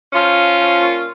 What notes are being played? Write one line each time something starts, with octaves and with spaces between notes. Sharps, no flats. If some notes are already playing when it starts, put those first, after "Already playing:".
F3 C#4 F4
F3
F3
A#2